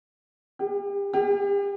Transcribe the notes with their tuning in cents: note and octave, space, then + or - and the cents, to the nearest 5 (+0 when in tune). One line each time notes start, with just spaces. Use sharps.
G4 +35
G4 +40